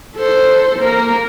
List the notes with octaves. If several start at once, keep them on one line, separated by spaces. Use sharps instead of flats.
A4 C5
A#3 A#4